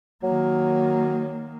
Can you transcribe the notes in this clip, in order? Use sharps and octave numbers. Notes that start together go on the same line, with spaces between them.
D#3 F#3 A#3